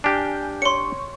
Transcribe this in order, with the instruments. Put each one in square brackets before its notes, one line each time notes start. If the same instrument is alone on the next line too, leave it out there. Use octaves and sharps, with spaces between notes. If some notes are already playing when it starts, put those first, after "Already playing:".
[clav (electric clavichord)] D4 G4 [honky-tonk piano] G#5 F6 G6
[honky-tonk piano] C#5 C#6 [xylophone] C6 C#7